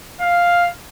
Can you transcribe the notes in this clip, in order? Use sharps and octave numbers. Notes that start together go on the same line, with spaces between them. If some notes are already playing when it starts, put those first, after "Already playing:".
F5